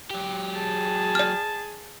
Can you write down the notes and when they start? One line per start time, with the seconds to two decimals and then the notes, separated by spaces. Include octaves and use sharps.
0.10 F#3 G4
0.56 G#4 A5
1.15 D5 F6